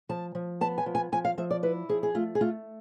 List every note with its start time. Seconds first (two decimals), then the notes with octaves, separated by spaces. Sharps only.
0.09 F3 A5
0.35 F3
0.61 B3 A5
0.78 G#5
0.86 F3
0.95 G#5
1.12 F3 G#5
1.25 F5
1.38 F3 E5
1.51 D5
1.63 E4 B4
1.89 F3 G#4
2.03 G#4
2.15 A3 F4
2.35 G#4
2.41 A3 F4